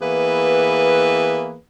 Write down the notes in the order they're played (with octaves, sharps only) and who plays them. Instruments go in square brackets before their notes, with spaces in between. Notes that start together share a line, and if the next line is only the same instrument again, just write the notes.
[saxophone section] E3 A#3 B3 G#4 B4